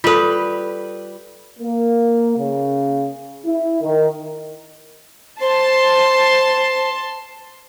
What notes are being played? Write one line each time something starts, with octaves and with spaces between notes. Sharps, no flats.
G3 F4 A4 B4
A#3
C#3
E4
D#3
C5 A5 C6